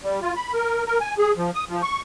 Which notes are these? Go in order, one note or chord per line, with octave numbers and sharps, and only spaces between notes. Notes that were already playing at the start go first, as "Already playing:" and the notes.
G3
F4
B5
A#4
A#4
G#5
G#4
F3
D#6
F3
C#6